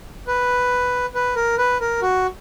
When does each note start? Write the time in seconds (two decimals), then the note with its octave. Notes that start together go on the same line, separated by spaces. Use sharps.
0.27 B4
1.15 B4
1.36 A#4
1.58 B4
1.81 A#4
2.02 F#4